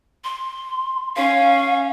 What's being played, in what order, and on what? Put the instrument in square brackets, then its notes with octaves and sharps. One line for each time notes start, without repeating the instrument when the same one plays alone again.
[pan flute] C6
[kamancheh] C#4 [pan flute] F5